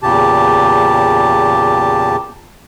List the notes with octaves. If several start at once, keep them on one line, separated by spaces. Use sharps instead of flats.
E2 A#2 C#3 G4 A5